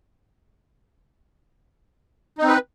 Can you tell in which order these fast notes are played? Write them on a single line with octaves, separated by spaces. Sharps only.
D#4 C4 B4